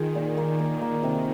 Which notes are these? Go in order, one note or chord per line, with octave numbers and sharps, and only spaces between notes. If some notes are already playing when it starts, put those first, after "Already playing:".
Already playing: D#3 F4 G#4
A#2
A#3
A#3
A#3
C3